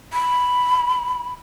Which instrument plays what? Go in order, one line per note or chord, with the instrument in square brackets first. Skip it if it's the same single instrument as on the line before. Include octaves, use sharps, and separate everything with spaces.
[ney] B5